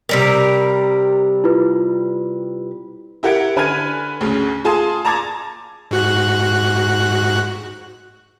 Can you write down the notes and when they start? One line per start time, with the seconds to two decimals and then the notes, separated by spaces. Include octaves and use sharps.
0.09 C3 G3 A#4
1.44 E4 F4 B4
3.23 E4 G4 A#4 F#5 G#6 D7
3.56 D3 B4 G#5 F6 G#6 D#7
4.21 D2 C#3 C#4
4.65 F4 G#4 G#5 A5 C6 D#6
5.05 A5 A#5 D6 G#6 A6
5.91 G#2 F#4 F#6